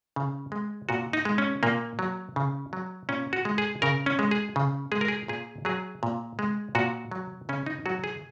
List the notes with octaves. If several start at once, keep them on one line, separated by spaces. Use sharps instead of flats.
C#3
G#3
A#2 F#4
D#4
G#3
C#4
A#2 A#3
F#3
C#3
F#3
A#2 C#4
F#4
G#3
G#4
C#3 A#4
C#4
G#3
G#4
C#3
G#3 G#4
A#4
G#4
A#2 G#4
F#3 G#4
A#2
G#3
A#2 F#4
F#3
C#3 C#4
D#4
F#3 F#4
G#4